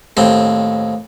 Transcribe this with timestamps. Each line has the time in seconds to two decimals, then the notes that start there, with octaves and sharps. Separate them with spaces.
0.17 D#2 A2 C4